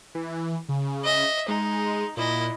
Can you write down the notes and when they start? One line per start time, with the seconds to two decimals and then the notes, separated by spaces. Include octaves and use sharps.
0.15 E3
0.69 C#3
1.04 D#5 E5
1.48 G#3 D#4
2.17 A#2 E4 D#5